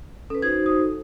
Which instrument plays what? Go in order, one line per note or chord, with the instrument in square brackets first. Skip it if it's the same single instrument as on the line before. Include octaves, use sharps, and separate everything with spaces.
[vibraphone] C#4 B4 [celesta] A4
[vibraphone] D#4 F#4 C5 [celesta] G#6
[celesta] D#6
A4